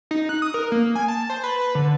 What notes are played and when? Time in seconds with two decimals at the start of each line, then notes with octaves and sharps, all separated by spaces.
0.11 D#4
0.29 F#6
0.42 D#6
0.54 A#4
0.72 A#3
0.95 G#5
1.08 A5
1.30 C5
1.44 B4
1.61 B4
1.75 D3